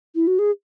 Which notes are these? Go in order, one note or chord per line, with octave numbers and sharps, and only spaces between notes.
E4
F#4
G#4